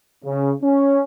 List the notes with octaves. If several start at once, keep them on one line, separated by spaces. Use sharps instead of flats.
C#3
C#4